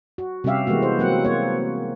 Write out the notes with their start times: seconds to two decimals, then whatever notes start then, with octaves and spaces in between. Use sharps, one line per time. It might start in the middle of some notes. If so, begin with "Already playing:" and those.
0.18 F#4
0.44 C3 G3 C#4 G4 E5 F5
0.67 E3 G#3 A#3 B3 F#4
0.82 C5
0.99 F#3 A#3 C4 F#5
1.25 A#3 C#5